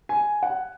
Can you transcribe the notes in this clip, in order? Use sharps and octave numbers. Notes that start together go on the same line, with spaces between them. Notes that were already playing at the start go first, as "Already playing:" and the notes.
G#5
F#5